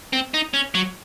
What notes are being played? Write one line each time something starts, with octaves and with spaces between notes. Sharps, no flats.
C4
D#4
C#4
F#3